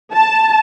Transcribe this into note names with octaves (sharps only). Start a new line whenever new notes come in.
A5